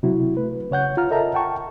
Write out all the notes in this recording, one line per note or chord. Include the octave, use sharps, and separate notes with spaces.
C3 F#3 E4 F#4
A3 B4
C#3 C#5 F#5 G6
F4 F#5 A#5 F6
A4 A#4 D#5 E5 A5 A#5
F#5 G5 A5 C#6